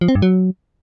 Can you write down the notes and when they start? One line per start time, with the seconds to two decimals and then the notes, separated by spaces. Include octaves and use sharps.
0.01 F3
0.08 C4
0.15 G2
0.22 F#3